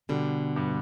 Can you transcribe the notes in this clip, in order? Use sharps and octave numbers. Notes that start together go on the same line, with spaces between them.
B2 D3 G3
G2